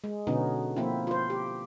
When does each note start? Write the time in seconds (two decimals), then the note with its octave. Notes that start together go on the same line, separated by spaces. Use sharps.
0.04 G#3
0.27 B2 D3 B3 C#4 D#4
0.76 F3 A#3 C4 E4
1.07 F4 C5
1.30 G4